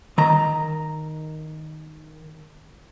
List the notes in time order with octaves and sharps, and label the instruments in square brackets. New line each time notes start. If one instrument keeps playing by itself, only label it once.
[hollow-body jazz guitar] D#3 A#5